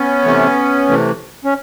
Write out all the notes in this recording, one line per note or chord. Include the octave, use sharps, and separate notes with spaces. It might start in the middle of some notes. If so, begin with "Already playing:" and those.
Already playing: B3 C#4
C3 E3 A3
C3 E3 A3
C#4